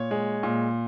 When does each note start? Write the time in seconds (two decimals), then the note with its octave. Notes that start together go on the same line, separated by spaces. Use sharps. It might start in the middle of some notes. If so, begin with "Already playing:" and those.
Already playing: A#2 C#5
0.11 G#3
0.43 A#2